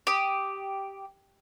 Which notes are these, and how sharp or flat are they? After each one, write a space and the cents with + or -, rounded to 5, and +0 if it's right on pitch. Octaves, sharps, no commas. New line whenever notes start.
G4 -5 D#6 +0